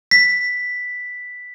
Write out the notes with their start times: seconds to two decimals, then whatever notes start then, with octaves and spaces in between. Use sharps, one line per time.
0.11 B6